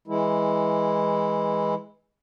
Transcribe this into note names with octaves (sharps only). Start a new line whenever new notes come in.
E3 G#3 E4